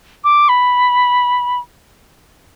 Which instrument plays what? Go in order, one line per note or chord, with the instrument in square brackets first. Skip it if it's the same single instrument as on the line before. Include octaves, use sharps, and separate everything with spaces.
[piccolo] D6
B5